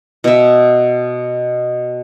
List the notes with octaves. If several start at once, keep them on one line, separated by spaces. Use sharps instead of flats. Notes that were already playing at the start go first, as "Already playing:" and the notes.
B2 E5